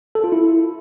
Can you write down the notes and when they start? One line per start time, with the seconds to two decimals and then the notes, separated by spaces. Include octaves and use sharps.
0.15 A4
0.24 F4
0.32 E4